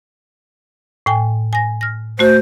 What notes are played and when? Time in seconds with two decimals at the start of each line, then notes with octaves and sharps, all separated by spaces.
1.06 A2 G5 G#5
1.53 G#5 A#6
1.81 F6 A#6
2.19 A3 F#4 C5